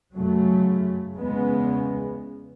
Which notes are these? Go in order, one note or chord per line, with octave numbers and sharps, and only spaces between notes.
F#2 C#3 F#3 A3
E2 C#3 G#3 B3